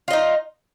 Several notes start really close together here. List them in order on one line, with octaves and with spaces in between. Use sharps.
F4 D#5 D#4